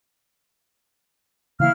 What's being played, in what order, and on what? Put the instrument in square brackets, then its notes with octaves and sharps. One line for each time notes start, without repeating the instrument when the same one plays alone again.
[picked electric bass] C#3 E3 A#3 [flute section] E4 F5 F6